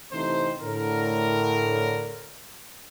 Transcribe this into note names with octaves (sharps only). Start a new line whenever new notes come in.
C3 E3 A3 C4 D#4 C5
A2 D3 A#4